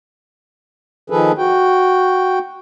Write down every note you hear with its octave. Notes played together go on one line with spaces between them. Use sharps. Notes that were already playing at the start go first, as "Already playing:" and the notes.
D#3 F3 G#4 A4 B4
F#4 G5